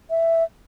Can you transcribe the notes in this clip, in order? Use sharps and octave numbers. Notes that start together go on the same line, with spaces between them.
E5